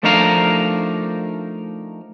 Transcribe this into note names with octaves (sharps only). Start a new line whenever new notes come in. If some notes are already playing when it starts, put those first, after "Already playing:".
F3 A3 D4 D#4 A#4 F5